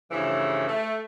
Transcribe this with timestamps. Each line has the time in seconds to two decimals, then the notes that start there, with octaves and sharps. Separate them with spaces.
0.11 G2 C#3 E3 F3 A3
0.67 A3